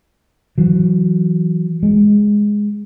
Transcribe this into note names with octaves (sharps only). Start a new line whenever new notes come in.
E3 F#3
G#3